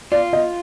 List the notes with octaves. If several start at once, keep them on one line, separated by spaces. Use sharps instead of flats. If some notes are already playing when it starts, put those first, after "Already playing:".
F4 D5
D#5